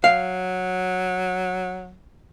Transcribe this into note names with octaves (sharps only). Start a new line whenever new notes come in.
F#3 F5